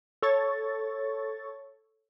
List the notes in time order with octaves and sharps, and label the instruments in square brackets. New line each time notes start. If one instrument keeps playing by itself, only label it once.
[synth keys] A4 C#5 C#6 A6